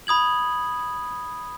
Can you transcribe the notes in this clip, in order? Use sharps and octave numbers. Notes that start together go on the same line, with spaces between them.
B5 D#6 G#6 F#7